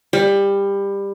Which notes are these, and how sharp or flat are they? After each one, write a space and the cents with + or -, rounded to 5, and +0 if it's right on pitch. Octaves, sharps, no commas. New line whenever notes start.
G3 +20